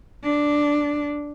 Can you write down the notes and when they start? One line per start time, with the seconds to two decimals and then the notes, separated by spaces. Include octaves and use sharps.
0.23 D4